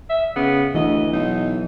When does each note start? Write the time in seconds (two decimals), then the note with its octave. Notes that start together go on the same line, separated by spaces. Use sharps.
0.09 E5
0.36 C#3 B3
0.74 D2 E3 D#5
1.13 B1 D#4